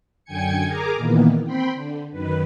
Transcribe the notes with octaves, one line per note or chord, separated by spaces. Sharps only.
F#2 D3 G5 G#5 G#6 C#7
G#4 A#4 G#5 A#5 D6
A#2 D#3 E3 A#3 B3
C4 G5 B5 C6
D3
F#2 D#3 B4